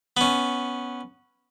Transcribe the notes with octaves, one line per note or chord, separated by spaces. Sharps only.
B3 C#4